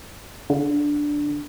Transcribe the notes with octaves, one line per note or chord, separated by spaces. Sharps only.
D3